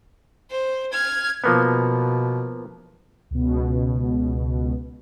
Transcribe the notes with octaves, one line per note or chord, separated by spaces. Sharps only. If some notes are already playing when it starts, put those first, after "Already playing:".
C5
F6 G#6
B2 F3 A#3 B3
C#2 B2